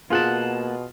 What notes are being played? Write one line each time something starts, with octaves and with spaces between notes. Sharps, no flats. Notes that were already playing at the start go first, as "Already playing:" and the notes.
B2 A#3 F4 G#4 F#5 A5